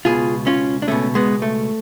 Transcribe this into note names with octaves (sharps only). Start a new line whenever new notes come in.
C#2 B2 F4 G#4
C#4 F4
D4
C#2 B2 A3 C#4
G#3 B3
A3